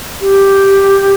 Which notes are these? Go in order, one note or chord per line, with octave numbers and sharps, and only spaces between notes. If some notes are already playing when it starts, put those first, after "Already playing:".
G4